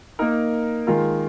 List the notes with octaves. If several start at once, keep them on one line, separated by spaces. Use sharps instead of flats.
A#3 D#4 A#4
D#3 G#3 F4 A#4